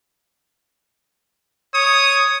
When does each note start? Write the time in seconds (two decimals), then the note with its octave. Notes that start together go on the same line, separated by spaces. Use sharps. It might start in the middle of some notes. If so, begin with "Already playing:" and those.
1.74 C#5 D#6